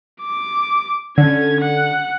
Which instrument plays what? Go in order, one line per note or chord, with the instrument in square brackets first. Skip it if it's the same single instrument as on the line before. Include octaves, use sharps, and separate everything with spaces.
[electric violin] D6
[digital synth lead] D3 [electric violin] C#4 G#6
[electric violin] F#5